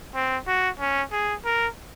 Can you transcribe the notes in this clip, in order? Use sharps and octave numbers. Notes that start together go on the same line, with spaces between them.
C4
F#4
C#4
G#4
A#4